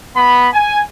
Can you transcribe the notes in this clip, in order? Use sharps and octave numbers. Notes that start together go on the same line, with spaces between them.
B3 B5
G#5